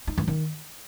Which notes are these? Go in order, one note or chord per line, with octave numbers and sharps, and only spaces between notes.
D#4
E3
D#3